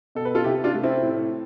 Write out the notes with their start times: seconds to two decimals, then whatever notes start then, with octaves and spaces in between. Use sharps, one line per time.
0.15 B2 A4
0.25 B4
0.35 F4 A4
0.44 C3 E4 G4
0.64 D4 F4
0.74 A3
0.83 C4 E4
1.02 A2